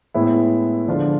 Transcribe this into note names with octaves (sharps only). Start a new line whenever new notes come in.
A2 G#3 B3 E4
D3 F3 G#3 D4 F4